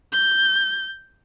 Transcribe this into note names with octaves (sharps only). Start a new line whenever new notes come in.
G6